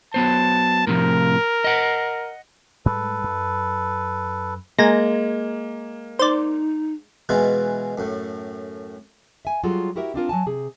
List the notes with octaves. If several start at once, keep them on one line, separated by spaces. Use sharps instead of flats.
F#3 B3 C5 A5
A2 C3 F3 A#4
D#5 F#5
G#2 G3 G#3 A4 B4
F#2
G#3 A#3 G#5 A#5 A#6
D#4 C5 D5
B2 E3 G#3 E4 F4
F#2 A2
E5 G#5
F#3 G3 F4 F#4 G#4 A4
E4 F#4 G4 A#4 E5
C4 D4 F4 A#4
F#3 G#5 A5
C3 G#4